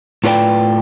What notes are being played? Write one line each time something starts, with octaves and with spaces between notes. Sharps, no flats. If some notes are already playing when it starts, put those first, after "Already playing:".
A2 F4 B4 D5 G5